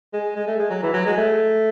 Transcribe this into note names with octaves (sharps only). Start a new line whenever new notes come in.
G#3
G#3
A3
G#3
F#3
E3
F#3
G#3
A3